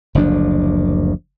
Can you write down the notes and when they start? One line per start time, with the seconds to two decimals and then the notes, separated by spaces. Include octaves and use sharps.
0.15 F#1 D2 F3 D4